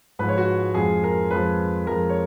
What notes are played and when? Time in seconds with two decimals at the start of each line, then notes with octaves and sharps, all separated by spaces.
0.19 G#2 F3 G#3 B4
0.29 C#5
0.37 F#4
0.74 F2 F3 G#3 G#4
1.04 A#4
1.31 F2 F3 G#3 B4
1.87 F2 F3 G#3 A#4
2.09 C#5